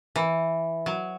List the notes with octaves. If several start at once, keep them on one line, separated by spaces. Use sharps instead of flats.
E3
F#3